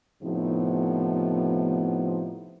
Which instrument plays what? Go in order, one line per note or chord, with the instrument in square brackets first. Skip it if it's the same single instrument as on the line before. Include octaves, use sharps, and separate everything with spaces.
[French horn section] A2 C3 F3 B3 D#4